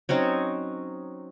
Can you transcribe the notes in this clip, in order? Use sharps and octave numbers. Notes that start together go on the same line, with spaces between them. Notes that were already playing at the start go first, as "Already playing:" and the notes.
F#3 C4 C#4 D#4